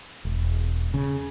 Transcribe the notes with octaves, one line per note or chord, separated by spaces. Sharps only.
E1
C#3